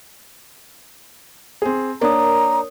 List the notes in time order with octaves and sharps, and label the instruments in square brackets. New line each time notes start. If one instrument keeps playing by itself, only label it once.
[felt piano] C4 G#4
[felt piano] A#3 D4 [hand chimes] A#4 C#5 D#6 [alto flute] A#5